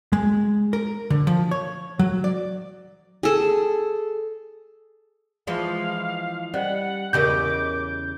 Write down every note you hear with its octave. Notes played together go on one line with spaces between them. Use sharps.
G#3
A#4
D3
F3
C#5
F#3
D5
G#4 A4
E3 F3 G#3 F5
G3 C#4 C5 D#5 F#5
E2 C#3 C#4 G4 A#4 D#5 D6 G6